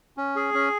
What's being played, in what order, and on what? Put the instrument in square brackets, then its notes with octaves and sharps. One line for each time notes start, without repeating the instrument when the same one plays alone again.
[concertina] C#4
G#4
C#4